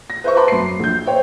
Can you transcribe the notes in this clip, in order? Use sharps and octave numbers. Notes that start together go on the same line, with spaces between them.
A#6
B4 C5 E5 C#6
B4 A5 B5 C6 D6
F#2 C7
A#1 G6
C5 C#5 G5